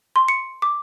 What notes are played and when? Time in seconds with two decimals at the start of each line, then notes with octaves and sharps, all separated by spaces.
0.16 C6
0.28 C#7
0.62 D6